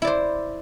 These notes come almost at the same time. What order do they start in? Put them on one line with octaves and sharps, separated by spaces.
E4 D5 C5